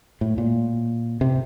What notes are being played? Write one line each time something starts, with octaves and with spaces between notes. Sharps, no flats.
A2
A#2
C3